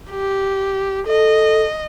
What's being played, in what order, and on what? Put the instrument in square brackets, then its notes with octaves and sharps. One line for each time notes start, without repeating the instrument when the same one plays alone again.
[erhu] G4
[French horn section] A4 [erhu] D#5